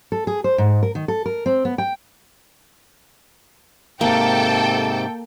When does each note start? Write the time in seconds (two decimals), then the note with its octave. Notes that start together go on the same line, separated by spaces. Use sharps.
0.12 A4
0.27 G#4
0.44 C5
0.58 G#2
0.83 A#4
0.95 D#3
1.08 A4
1.26 A#4
1.46 C4
1.65 B3
1.78 G5
4.01 G#2 C3 A#3 A4 G5